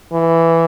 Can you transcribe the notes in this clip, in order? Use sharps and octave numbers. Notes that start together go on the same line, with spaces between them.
E3